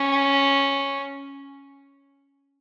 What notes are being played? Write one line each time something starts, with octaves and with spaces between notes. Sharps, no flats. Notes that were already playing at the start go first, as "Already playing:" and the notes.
Already playing: C#4